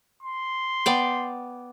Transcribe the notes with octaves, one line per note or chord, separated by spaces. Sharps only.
C6
B3 D5 G5